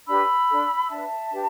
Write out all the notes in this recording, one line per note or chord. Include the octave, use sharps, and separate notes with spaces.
D4 G4 B4 B5 E6
D4 A4
D4 B4 E5 A5
D4 G4 B4